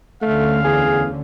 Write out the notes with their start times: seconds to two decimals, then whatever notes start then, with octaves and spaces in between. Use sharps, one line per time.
0.22 D2 D3 A3 C#4 F5
0.64 E2 G#4